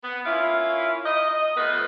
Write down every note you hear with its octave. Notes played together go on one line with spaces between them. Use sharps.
B3
A#3 C#4 E4 F4
D#5
F3 A3 B3 B4